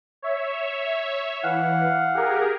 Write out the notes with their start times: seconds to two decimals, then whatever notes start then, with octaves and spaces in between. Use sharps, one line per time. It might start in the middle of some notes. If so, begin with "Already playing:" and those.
0.22 C#5 E5
1.43 E3 F5 F#5
2.14 G4 G#4 A#4